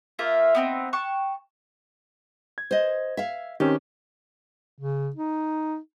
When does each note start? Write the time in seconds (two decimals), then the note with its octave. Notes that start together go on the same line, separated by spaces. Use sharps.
0.19 A#3 F4 A#4 E5
0.55 B3 C4 D#4
0.93 G5 A5 C#6 F#6
2.58 G#6
2.71 C5 D#5
3.17 E5 F5
3.60 D#3 C4 C#4 G4
4.79 C#3
5.16 D#4